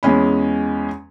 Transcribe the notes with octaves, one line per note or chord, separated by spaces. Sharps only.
E2 G#3 C#4 B5